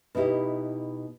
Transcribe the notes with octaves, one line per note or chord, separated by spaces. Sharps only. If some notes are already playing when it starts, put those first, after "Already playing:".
B2 D#4 E4 G4